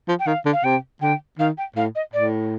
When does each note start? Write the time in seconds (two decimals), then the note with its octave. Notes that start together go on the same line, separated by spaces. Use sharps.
0.08 F3
0.20 G5
0.27 D#3 F5
0.46 D3
0.53 F5
0.64 C3 G5
1.02 D3 G5
1.39 D#3 F5
1.58 G5
1.76 A2 F5
1.95 D#5
2.14 A2 D5